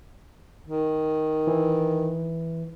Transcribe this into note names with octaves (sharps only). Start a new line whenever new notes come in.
D#3
E3